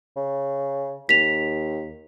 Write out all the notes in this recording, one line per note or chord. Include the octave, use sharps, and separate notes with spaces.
C#3
D#2 B6 F7